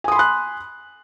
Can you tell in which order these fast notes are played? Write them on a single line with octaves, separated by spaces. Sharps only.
G#5 D#6 C6 B5 F#6